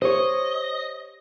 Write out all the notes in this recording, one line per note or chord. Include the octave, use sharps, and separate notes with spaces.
G4 C5 C#5 D#5